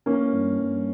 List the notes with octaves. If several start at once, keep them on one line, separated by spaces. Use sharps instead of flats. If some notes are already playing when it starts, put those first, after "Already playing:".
E3 A#3 C#4
G2
G2